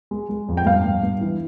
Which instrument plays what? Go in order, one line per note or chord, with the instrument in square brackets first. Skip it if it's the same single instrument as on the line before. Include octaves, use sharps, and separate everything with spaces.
[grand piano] G#3
G#3
F2
G5
G2 F5
G2
G2
E3